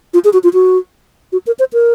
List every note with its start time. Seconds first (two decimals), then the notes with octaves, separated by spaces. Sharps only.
0.14 F4
0.24 G#4
0.33 F#4
0.44 F4
0.54 F#4
1.32 F#4
1.47 A#4
1.59 C5
1.73 A#4